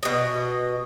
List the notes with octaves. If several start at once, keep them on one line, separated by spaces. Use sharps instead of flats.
B2 D#5